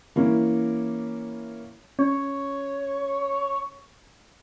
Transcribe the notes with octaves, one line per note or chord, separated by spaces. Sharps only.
E3 A#3 C#4 E4
C#4 C#5